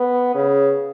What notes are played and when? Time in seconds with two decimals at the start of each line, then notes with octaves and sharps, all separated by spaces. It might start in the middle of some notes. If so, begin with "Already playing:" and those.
Already playing: B3
0.35 C#3